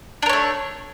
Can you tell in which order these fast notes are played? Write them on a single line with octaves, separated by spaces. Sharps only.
D4 A#4 C#5 A3